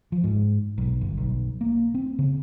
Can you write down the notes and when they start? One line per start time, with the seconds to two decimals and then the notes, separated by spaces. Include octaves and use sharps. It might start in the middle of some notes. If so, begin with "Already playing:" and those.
0.12 F3
0.24 G#2
0.78 B1
1.01 G1
1.18 B1
1.61 A#3
1.94 C4
2.19 C#3